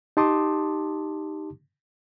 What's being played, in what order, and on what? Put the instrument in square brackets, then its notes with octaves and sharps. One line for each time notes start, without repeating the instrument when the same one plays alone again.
[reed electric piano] D#4 G4 A5 C6 D6 D#6